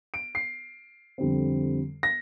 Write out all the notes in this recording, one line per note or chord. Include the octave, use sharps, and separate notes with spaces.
D7
C7
F2 D3 G3 C4
A#6